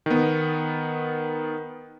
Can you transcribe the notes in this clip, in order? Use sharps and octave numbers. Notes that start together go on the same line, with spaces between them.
D#3 B3